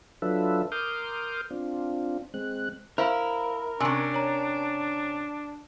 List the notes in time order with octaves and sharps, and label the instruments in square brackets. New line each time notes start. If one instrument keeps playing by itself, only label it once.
[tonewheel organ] F#3 D4 F4 A4 B4 E5
A#4 C6 D6 D#6 F6 G6
C4 D4 F4
G#3 C4 F#6
[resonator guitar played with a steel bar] E4 [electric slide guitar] A#4 [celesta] C5 F5 B5
[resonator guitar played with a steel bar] C3 C#4 [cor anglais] D4 [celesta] G#5 E6
[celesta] C#5 A#5